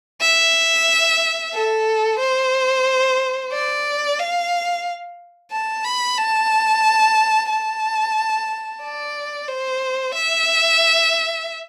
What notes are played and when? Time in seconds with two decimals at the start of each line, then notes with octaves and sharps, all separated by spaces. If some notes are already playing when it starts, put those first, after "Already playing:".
0.21 E5
1.54 A4
2.19 C5
3.52 D5
4.19 F5
5.52 A5
5.84 B5
6.18 A5
7.50 A5
8.83 D5
9.48 C5
10.15 E5